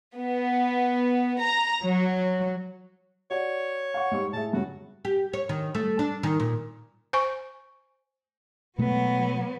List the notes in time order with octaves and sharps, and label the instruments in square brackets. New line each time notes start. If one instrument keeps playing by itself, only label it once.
[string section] B3
A#5
F#3
[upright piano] F#4 D5 [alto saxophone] C#5
[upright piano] F5 F#5 C#6
G#2 G3 C#6
[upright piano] A2 G#4 E5 [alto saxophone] A5
[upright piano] G2 C#3 [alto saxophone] F#4
[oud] G4
C#5
D#3
A3
D4
D#3
A#2
[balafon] C5 G#5 C#6
[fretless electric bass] B2 G#3 A3 [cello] F#3 B3